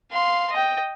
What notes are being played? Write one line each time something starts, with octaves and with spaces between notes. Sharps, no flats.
F5 C6
D#5 G5